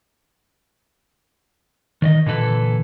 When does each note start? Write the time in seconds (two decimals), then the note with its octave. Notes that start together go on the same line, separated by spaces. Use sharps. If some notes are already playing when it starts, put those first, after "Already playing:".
2.02 D#3 D5 D#5
2.26 A#2 D3 E3 A4 B4